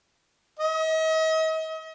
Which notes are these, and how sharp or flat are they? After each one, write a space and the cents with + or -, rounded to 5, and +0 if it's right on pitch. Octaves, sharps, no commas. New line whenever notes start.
D#5 +40